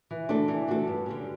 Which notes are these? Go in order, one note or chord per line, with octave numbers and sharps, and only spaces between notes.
E3
A3 D4 F#4 A4
E3
A3 D4 F#4 A4
G2
D3 G3 C#4